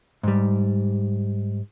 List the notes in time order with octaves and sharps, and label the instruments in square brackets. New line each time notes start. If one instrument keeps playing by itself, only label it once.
[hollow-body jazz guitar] G#2 G3